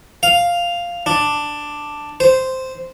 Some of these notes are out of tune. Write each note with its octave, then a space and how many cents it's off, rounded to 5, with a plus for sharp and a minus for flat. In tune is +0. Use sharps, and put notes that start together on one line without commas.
F5 +0
D4 +5
C5 -5